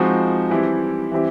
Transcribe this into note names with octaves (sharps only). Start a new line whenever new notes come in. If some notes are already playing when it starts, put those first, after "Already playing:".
Already playing: F3 G#3 C4 D#4 F#4
E3 G3 C4 E4 G4
E3 G3 C4 E4 G4